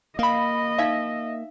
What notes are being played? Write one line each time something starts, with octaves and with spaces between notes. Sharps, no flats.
A#3 D#5 F5 B5
D#4 E5 F5